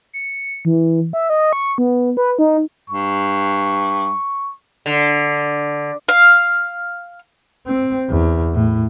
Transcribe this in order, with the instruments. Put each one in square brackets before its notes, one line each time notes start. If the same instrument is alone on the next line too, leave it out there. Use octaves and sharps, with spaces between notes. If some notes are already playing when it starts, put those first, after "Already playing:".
[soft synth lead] C#7
E3
E5
D#5
C#6
B3
B4
D#4
[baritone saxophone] G2 [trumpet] C#6
[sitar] D3
[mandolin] F5
[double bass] C4
E2
A2